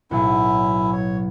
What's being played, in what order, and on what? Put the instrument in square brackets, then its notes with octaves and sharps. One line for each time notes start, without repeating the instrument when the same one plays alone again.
[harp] B1 A2 F#3 [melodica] C#4 E4
[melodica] C#5